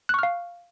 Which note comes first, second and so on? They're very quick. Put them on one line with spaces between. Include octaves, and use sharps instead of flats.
F#6 C#6 F6 F5